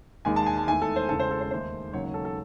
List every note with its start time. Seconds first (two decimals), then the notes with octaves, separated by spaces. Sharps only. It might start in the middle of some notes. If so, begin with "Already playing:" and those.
0.25 E1 D#2 D#3 G#3 G#5
0.36 A5
0.46 G#5
0.57 A5
0.67 E2 D#3 A3 G#5
0.82 A4
0.96 C5
1.09 E1 E2 C#3 A4
1.19 C5
1.31 A4
1.41 C5
1.51 D#2 D#3 A3 C5
1.93 E1 D#2 C#3 F#3 C#5
2.04 C#5
2.14 A4
2.25 A4